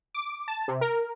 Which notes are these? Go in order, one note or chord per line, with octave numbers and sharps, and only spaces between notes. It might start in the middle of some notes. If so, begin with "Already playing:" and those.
D6
A5
C3
A#4